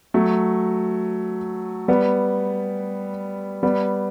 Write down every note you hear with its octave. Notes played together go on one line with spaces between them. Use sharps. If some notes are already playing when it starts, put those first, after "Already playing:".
F#3 A3
G3 B3
G3 B3